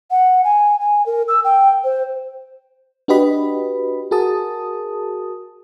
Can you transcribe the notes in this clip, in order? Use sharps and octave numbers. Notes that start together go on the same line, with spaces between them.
F#5
G#5
G#5
A#4
E6
G5
C5
D4 F#4 G4 B4 D#5 B5
F#4 G#4 A#4 A5 D#6